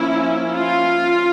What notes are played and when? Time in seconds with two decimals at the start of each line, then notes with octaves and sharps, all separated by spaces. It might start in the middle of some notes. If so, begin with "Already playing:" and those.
Already playing: F3 A#3 C#4 E4
0.55 F4